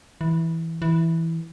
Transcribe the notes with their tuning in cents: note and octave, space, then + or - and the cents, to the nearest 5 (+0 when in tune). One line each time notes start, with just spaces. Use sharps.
E3 -10
E3 -5